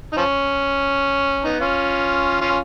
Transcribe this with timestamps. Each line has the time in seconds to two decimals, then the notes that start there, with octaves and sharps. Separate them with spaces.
0.12 D#4
0.17 F3 C#4
1.44 B3 D#4
1.60 C#4 F4
2.41 C#4 F4